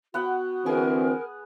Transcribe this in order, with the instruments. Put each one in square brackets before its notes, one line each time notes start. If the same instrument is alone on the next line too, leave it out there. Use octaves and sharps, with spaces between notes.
[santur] B3 F#5 G5 [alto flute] F#4
[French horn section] D3 E3 C4 [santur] G#4 [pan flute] A#4